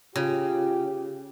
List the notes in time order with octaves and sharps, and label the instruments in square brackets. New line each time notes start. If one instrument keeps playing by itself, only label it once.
[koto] C#3 [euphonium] F4 [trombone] G4